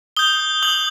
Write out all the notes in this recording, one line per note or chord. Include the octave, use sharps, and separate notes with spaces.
D#6 G6 G7
D#6 G6 F#7